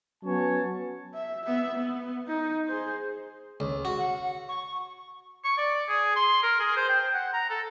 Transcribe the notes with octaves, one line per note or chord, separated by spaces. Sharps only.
F#3 B3 C#4 C#5 A5
E5
B3 E5
B3
D#4
G#4 C5
C#2
F#4
F#5
C#6
C#6
D5
G#4
C6
A#4
G#4
C5
G5
F#5
A#5
A4